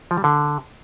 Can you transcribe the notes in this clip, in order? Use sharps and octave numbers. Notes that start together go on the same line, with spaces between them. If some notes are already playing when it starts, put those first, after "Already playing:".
F3
G3
D3